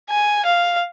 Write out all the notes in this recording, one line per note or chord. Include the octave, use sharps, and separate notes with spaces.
G#5
F5